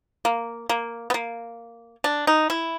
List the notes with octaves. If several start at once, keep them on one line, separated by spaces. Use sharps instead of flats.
A#3
A#3
B3
A#3
D4
D#4
E4